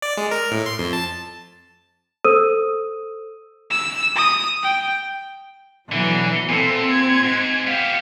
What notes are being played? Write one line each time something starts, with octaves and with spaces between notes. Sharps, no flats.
D5
G#3
A#4
A2
C6
F2
A5
A4 C5 D#6 E6 D#7
E6
D#6
G5
B2 D3 E3 F#3
A#2 C4 A4
G#6
G#2
B3 G4 F5 G5